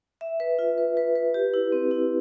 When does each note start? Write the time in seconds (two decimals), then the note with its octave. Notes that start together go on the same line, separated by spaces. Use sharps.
0.21 E5
0.40 B4
0.59 F4
0.78 B4
0.97 B4
1.15 B4
1.34 G4
1.54 E4
1.72 C4
1.91 E4